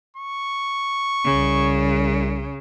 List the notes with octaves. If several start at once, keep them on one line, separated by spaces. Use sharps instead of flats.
C#6
C2 C#3